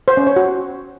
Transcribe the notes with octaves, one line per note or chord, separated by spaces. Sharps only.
C5
C#4
C#5
F#4